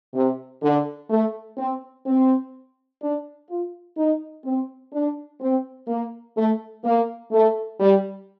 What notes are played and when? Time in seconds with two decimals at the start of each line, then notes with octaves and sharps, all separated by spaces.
0.14 C3
0.62 D3
1.10 A3
1.58 C4
2.07 C4
3.01 D4
3.49 F4
3.97 D#4
4.45 C4
4.93 D4
5.41 C4
5.88 A#3
6.37 A3
6.84 A#3
7.32 A3
7.80 G3